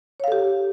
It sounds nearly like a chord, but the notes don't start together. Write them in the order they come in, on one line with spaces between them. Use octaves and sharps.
C#5 F5 A4 G4